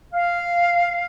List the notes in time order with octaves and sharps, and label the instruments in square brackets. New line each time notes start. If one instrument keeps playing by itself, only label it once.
[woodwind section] F5